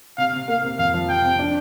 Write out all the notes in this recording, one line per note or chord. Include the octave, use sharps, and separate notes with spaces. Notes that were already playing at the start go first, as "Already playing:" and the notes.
C3 F5
C3
A#3 F5
C3
F2 F5
F3
C3 G5
C3
D4